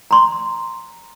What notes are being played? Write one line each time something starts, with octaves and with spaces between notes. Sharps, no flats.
A#5 C6